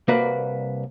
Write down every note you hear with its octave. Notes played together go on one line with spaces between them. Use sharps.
C2 A#3 F#4 B4 D5